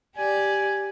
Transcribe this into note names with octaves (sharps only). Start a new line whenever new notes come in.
G4 D5 G#5